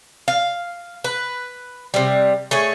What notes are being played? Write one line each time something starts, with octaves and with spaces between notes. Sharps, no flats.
F5
B4
C3 G3
A3 G#4 C#5